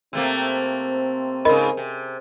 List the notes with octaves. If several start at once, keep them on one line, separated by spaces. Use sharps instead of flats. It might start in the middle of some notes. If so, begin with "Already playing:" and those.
C3 A3 A#3 C4
G#2 C#3 A#4 D#5 B5
C3